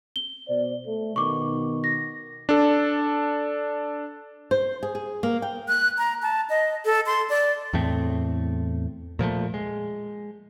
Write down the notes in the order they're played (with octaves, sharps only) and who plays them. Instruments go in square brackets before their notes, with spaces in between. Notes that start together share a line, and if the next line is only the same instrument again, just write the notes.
[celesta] G7
[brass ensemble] B2 C5 D5
A3
[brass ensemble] B2 D#3 [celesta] C#6 D6
[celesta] A#6
[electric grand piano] D4 A4
[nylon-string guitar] C5
G#4
G#4
A#3
G5
[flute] F#6
A#5
A5
D#5
A4
C6
D5
[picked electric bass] E2 A2 A3 C4
A#2 F3 F#3 A3
G#3